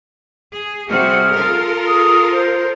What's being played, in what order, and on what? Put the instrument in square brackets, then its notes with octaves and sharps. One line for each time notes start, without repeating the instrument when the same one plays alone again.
[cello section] G#4
[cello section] C3 G3 F#4 [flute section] G#4 F6
[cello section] F4 A4 A#4
[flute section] G#4 D#6
C5